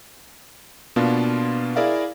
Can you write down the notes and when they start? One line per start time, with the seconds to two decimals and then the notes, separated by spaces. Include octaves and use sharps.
0.96 B2 A#3 B3 D4 F4
1.76 E4 G#4 A#4 D5 E5 F5